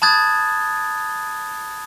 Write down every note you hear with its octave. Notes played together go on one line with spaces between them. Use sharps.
A5 B5 D#6 F#6 G#6 A6